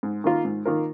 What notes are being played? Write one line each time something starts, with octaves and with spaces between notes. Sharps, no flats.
G#2
D#3 A#3 F4 A#4
G#2
D#3 A#3 F4 A#4